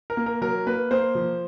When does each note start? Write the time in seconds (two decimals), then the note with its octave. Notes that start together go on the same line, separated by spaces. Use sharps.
0.10 A#4
0.17 A#3
0.26 A#4
0.41 F#3 A#4
0.66 A#3 B4
0.91 A#3 C5
1.15 F3